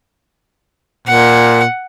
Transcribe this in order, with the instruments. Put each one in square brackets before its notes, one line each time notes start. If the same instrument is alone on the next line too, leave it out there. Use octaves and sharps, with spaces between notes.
[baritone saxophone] A#2 [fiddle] F#5